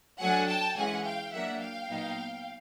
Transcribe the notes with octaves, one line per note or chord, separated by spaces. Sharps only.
F#3 A3 D4 F#5 G#5
G5 A5
E3 G#3 C#4 F#5 G#5
F5 G5
F#3 A#3 D4 E5 F#5
F5 G5
A#2 F#3 B3 D#4